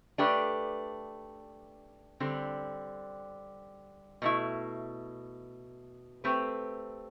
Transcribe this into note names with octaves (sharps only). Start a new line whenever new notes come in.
A3 D4 G4 B4
D3 G3 C4
B2 A3 E4
A3 C4 G4 B4